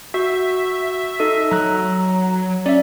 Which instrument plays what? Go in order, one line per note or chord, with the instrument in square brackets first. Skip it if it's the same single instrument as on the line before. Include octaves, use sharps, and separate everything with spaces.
[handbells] F#4 [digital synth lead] E5
[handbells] D#4 A4 D#5
[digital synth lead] F#3 [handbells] A#5 F#6
[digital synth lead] C#4 [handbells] D5 E5